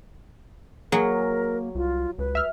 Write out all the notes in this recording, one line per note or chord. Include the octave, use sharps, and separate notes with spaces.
F#3 A#3 G#4 A#4
C2 F4
C#2 B4
E5 F6